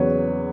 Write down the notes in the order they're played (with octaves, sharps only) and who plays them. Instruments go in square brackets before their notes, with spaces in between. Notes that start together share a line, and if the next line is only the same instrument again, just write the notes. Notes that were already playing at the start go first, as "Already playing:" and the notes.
Already playing: [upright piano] E2 C#3 F#3 B4 C#5